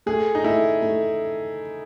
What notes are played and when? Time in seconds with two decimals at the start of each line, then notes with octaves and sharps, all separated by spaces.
0.06 A3 G#4
0.35 D#4
0.44 A3 E4
0.82 A3